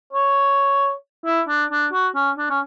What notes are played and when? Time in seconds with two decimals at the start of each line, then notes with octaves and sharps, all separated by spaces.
0.13 C#5
1.25 E4
1.48 D4
1.70 D4
1.92 F#4
2.15 C#4
2.37 D4
2.50 C#4